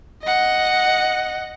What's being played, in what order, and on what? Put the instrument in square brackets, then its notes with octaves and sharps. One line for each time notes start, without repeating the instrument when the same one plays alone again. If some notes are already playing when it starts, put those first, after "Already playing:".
[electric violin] D#5 F#5